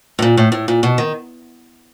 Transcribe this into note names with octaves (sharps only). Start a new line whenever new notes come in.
A2
A#2
A2
A2
A#2
B2
D#3